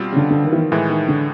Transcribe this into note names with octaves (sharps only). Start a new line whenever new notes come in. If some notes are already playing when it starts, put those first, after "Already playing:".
Already playing: B2 G3 C4 F4
C#3
D3
D3
D#3
E3
D#3
A2 D#3 E3 G#3
D#3
D3